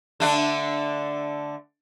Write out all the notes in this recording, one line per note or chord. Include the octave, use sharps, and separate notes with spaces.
D3 A3 D4